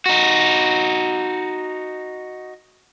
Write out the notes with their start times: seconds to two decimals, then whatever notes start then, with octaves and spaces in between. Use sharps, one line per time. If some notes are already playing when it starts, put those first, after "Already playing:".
0.06 D#4 F#4